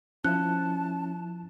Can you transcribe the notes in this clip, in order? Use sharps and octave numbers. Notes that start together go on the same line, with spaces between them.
F3 C#4 E4 A5 F#6